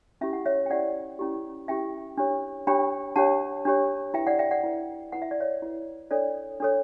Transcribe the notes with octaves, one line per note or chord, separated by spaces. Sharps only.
C#4 E4 G4 E5
F#5
C#5 E5
G5
C#4 E4 G4 D5 F#5
C#4 E4 G4
C#4 E4 G4 E5 G5
D4 G4 C#5
D4 G4 C#5 G5 B5
D4 G4 C#5 F#5 A5
D4 G4 C#5
E4 B4 E5 G5
D5 F#5
E5 G5
D5 F#5
E4 B4
E4 B4 F#5
E5
D5
C#5 E5
E4 B4
D4 A4 C#5 D5
D4 A4 C#5